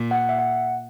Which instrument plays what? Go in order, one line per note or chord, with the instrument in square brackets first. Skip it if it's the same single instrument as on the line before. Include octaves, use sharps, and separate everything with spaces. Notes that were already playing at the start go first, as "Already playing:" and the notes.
Already playing: [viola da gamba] A#2
[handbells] F#5
E5
F#5